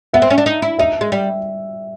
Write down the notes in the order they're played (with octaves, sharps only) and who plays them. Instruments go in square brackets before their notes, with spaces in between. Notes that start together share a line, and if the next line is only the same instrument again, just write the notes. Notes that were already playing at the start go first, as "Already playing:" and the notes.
[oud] B3 [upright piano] E5
[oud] C4
C#4
D4
D#4
E4
[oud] D#4 [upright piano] E5
[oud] G#3
G3